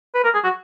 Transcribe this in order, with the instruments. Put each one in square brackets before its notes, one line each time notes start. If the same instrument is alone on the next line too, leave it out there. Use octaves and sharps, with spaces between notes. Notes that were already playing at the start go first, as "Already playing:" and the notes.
[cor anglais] B4
A#4
G#4
F#4